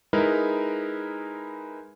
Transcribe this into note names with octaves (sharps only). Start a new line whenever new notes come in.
G#3 D#4 E4 A#4 B4